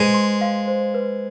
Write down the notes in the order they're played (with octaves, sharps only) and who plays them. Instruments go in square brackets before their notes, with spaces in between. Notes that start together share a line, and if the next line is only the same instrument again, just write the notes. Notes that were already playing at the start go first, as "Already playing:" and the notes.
Already playing: [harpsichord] G#3 [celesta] B4 C5
[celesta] C6
F5
C5
B4